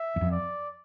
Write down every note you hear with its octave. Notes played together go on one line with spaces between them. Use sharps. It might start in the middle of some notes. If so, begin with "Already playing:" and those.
Already playing: E5
E2
F2
D5